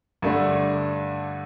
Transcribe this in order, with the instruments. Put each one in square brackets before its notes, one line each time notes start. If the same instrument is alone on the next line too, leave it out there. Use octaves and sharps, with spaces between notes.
[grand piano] G2 D3 A3 D4